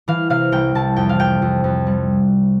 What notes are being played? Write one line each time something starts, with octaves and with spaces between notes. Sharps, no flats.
E3 F5
C3 F5
C2 G5
C2 A5
F2 G5
F5
F2 G5
F2
F2
G3